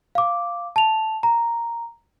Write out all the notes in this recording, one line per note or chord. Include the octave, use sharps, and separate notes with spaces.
F5 D6
A5 F7
A#5